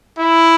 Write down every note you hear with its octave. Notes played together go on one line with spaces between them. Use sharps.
E4